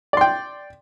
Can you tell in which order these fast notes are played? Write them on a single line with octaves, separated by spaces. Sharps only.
D5 C6 G5